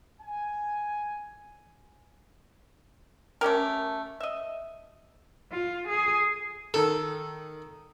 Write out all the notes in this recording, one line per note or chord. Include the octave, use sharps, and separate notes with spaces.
G#5
A3 C#4 G4 A#4
D#5 E5
F4
G#4
D#3 A4 E6